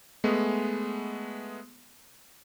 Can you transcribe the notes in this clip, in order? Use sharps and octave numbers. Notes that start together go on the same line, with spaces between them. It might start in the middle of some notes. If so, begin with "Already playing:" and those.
G#3 A3 B3